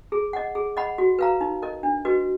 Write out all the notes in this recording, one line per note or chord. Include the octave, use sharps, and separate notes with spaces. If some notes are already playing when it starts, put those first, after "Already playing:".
G#4
D#5 F#5
G#4
D#5 F#5 B5
F#4
B4 F5 A#5
D#4
A#4 D#5
D4
F#4 B4 D#5